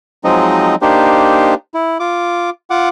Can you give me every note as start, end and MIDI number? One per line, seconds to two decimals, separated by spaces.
0.24 0.75 53
0.24 0.75 54
0.24 0.75 56
0.24 0.75 60
0.24 0.75 63
0.24 0.75 75
0.82 1.54 58
0.82 1.54 62
0.82 1.54 63
0.82 1.54 67
0.82 1.54 72
1.74 1.98 64
2.00 2.50 65
2.00 2.50 86
2.70 2.89 65
2.70 2.89 78
2.70 2.89 86